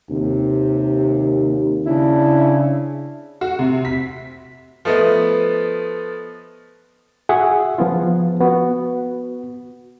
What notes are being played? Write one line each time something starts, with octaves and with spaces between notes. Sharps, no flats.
D#2 C3
C#3 D4 E4
F#4
C3
B6
F3 A3 B3 D#5
F#4 G#4 E5 F#5
F3 B3 F4
B3 F#4